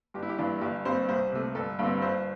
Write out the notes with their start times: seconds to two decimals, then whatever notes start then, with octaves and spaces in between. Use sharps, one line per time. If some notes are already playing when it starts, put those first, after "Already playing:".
0.14 G1 G4
0.22 E4
0.29 G4
0.38 G2 E3 D4
0.61 G1 G4
0.85 G2 G3 C4 C5
1.09 C2 C5
1.32 C3 A3
1.55 G1 A4
1.79 G2 D3 G3 C4
2.02 G1 C5